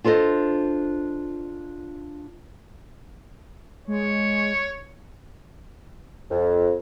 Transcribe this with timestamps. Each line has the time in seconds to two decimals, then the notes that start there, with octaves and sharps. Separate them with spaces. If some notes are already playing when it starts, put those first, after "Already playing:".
0.04 D4 F4 A4 C5 D#5
3.88 G#3 C#5
6.31 F2